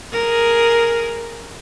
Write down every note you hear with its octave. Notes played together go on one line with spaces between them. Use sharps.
G#4 A#4